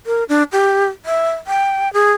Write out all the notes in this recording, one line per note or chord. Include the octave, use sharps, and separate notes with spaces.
A#4
D4
G4
E5
G5
G#4